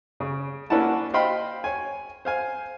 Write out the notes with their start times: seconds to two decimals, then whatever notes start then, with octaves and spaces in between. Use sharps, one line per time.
0.20 C#3
0.70 A#3 C#4 D4 E4 F#5 A5
1.13 C5 D#5 F5 G5 B5 C6
1.64 C#5 G#5
2.25 C5 F5 G#5